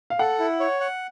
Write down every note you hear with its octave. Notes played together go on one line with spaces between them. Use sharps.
F5
A4 F#5
E4
C#5
F#5